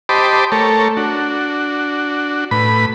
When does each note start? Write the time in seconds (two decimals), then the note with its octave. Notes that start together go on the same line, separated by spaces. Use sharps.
0.09 G4 C5 D#5 A5 B5 D6
0.52 A3 A4 A#4 C#5
0.97 D4 F#4
2.51 A2 B4 B5